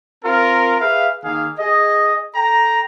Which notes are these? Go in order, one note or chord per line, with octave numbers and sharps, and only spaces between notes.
C4 F4 A#4
G#4 B4 E5 F5
D#3 A#3 G#4 F5
G#4 D#5
A4 G5 A#5